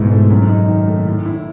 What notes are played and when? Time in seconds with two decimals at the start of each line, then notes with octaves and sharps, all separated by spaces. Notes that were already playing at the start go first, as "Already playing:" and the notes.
Already playing: C#2 G#2 B2 E4
0.11 A3
0.30 F#2
0.49 D#4
0.68 D#3
0.88 A3
1.06 A2
1.25 E4